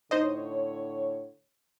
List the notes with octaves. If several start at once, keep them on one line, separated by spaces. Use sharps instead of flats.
A2 D3 D#4 C5 C#5 D#5